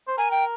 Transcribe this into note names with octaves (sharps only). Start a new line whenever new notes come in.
C5
A#4 G#5
G5